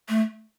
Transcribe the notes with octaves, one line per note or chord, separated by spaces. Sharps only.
A3